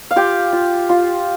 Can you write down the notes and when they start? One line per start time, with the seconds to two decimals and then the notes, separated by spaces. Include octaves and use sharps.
0.11 F5
0.16 F4 G4 G5
0.53 F4
0.89 F4